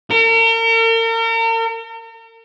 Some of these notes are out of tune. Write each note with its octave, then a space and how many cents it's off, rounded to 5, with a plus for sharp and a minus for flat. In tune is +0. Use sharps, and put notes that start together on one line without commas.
A#4 -40